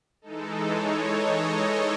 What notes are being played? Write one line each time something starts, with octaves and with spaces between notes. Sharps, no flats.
E3 G#3 D#4 A4
C#5
D#5
C#5